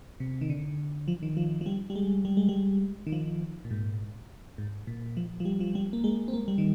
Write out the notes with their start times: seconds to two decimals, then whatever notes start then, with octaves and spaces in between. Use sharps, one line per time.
0.20 C3
0.41 D#3
0.50 D3
1.08 F3
1.23 D#3
1.37 F3
1.61 F3
1.66 G3
1.90 G3
1.96 G#3
2.25 G3
2.37 G#3
2.49 G3
3.07 D#3
3.12 F3
3.65 A#2
3.71 G#2
4.58 G#2
4.87 A#2
5.17 F3
5.40 F3
5.45 G3
5.60 F3
5.75 G3
5.93 A#3
6.04 G#3
6.28 C4
6.33 A#3
6.48 G3
6.58 D#3